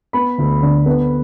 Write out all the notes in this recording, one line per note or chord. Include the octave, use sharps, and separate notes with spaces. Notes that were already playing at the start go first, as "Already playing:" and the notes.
B3 B5
D2
D3
B3